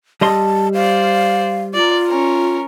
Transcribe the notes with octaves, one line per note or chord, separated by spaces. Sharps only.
G3 D#5 A5 C6
C5 D5 F5
F4 A#4 D5
C#4 A#4